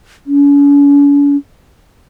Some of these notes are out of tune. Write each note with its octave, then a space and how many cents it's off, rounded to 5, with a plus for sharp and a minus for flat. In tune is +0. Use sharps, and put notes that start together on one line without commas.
C#4 +45